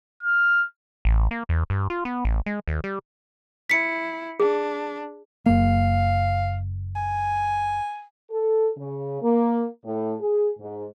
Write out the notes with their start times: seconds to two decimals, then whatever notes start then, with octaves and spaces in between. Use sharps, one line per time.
0.23 F6
1.05 A1
1.31 A#3
1.49 E2
1.70 G2
1.90 F4
2.05 B3
2.25 A1
2.46 G#3
2.68 D#2
2.84 G3
3.70 E4 B6 C#7
4.40 D4 G#4
5.46 F#1 A#3 F5
6.96 G#5
8.30 A4
8.77 C#3
9.22 A#3
9.84 A2
10.20 G#4
10.59 G#2